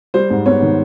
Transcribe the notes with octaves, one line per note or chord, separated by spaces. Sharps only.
G3 C5
G#2
B3 C#5
D#3